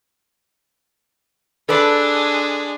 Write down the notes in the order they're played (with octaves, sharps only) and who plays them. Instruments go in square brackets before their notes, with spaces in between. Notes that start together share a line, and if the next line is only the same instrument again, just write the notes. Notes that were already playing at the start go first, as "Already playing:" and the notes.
[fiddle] G#3 D4 [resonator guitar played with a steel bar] A4 B4 D5